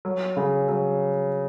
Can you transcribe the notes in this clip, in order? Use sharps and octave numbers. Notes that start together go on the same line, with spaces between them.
F#3
C#3
F#3